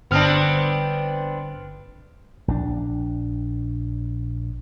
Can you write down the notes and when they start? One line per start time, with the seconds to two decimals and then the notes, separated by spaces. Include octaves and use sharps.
0.11 G1 B3 C4 D4 F6
2.48 A#1 D#3 D4